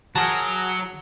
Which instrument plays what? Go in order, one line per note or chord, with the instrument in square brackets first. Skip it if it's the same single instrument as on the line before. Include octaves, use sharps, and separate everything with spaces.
[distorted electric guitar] F#3 [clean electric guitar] F#4 G#4 A#4 [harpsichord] A5 A#5